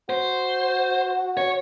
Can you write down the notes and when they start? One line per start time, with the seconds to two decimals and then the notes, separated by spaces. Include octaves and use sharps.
0.09 F#4 C5
1.37 F#4 C#5